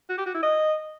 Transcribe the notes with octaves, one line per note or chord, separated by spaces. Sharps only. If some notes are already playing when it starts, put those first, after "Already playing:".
F#4
G4
F#4
E4
D#5